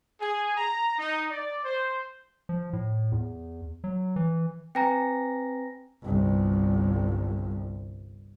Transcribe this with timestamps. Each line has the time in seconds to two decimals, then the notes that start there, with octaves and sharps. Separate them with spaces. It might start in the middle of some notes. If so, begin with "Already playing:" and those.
0.20 G#4
0.57 A#5
0.99 D#4
1.31 D5
1.64 C5
2.49 F3
2.73 A2
3.12 E2
3.84 F#3
4.16 E3
4.75 C4 B4 G5 G#5 A#5 A#6
6.02 G1 C2